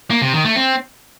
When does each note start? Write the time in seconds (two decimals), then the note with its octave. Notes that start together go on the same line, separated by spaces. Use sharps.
0.10 A#3
0.22 C3
0.33 D#3
0.44 A3
0.56 C4